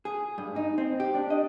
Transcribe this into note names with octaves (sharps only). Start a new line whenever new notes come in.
G#4
G2
D#4
C4
G4
D4
D#5